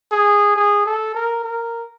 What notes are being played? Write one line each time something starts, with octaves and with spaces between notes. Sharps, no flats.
G#4
G#4
A4
A#4
A#4